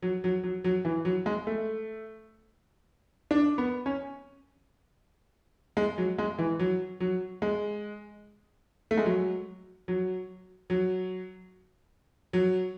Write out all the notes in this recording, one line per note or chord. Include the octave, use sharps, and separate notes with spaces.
F#3
F#3
F#3
F#3
E3
F#3
G#3
A3
D4
B3
C#4
G#3
F#3
G#3
E3
F#3
F#3
G#3
A3
G#3
F#3
F#3
F#3
F#3